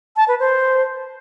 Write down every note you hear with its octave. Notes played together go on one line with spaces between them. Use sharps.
A5
B4
C5